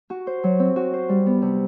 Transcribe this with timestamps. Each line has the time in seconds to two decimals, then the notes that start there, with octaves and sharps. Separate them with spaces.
0.10 F#4
0.27 C5
0.44 F#3
0.59 C4
0.76 F#4
0.93 C5
1.09 G3
1.26 B3
1.42 C3